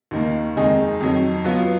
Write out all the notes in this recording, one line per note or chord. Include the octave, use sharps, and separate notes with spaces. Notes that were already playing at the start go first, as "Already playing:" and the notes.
D#2 D#3 A#3
F2 D#3 G#3 D#4 G#4
F2 D#3 F#3
F#3 B3 F4